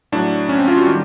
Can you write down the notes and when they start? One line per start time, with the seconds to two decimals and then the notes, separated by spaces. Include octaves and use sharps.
0.12 A2 F#3 D4
0.49 C#4
0.59 C4
0.68 F4
0.77 F#4
0.86 D#3 G3 G4